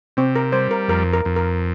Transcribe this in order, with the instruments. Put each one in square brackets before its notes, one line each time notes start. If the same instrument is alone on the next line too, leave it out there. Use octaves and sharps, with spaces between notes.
[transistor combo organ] C3 [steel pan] C4
[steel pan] A#4
[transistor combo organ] G3 [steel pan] C5
[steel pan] A#4
[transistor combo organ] F2 [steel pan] A#4
[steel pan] A#4
[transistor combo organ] F2
[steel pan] A#4